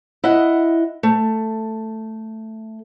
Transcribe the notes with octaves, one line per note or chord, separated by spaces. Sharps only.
E4 D#5 F#5
A3